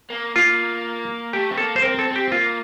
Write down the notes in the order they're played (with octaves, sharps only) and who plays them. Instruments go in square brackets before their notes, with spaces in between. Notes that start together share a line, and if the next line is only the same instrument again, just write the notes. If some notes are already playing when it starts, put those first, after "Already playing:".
[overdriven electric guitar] A#3
[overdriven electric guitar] A#3 [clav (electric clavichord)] F4
[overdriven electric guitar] A3 [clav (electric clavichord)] G4
[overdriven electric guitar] C4
[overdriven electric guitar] A#3 [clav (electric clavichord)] A4
[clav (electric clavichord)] C5
[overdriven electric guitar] C4 [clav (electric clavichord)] A#4
[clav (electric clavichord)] A4
[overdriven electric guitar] C4
[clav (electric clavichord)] G4
[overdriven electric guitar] A#3 [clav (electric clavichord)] F4